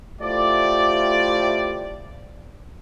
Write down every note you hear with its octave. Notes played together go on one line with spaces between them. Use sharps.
A3 E4 F4 G4 C5 D5